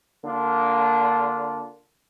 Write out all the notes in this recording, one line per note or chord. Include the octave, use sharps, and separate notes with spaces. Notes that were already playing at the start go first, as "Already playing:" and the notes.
D3 A#3 D4 F4